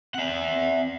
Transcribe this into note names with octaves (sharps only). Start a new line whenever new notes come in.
C4 E5 F#5